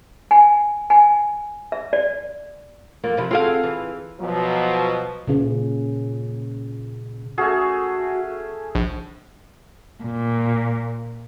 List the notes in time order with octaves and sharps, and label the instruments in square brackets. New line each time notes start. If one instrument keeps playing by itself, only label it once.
[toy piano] G#5
G#5
E5
D5
[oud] F2 A#3 F4
C3 F3 E4
[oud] C4 F#4 A4 [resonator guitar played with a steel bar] F4 G#4 F5
[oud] E3
[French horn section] B2 F3 F#3
[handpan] A#2 C#3
[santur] A3 C#4 G#4 [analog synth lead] F#4
[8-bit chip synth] A#1
[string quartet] A#2